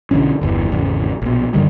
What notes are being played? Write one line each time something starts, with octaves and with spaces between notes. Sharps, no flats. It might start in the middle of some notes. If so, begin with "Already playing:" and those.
B1 D3 E3 C#4
G1 E2 E3
G#1 E2 C#3
A#1 B2
F#2 D3 D#3 G3